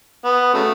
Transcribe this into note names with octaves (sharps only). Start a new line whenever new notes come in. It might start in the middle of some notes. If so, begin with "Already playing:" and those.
B3
C#3 F#3 A3